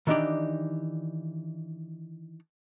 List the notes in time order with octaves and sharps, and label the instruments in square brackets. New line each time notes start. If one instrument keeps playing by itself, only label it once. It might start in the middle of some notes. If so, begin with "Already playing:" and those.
[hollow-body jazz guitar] D#3 E3 D4 D#4 G4 D5